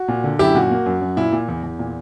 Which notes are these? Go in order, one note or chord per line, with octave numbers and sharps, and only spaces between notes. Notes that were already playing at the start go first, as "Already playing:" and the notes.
Already playing: F#4
A#2
D3
F#2 E4 G4
A#2 F#4
A#3
F#2
F#2
A#2 E4
A#2
E2
E2
A#2